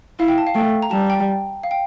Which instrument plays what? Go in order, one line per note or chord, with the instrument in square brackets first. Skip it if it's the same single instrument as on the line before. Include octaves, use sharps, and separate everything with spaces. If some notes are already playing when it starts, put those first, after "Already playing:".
[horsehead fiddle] E4 [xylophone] F5
[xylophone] G5
A5
F5
[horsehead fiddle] A3 [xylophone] G5
[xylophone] A#5
[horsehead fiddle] G3 [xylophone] A5
[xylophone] G5
F5
G5